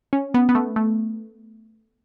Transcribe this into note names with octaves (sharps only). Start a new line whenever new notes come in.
C#4
B3
B3
A3
A3